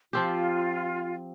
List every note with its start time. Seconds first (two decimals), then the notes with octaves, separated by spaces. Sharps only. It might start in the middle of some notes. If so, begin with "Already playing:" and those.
0.13 F3 C4 F4 G4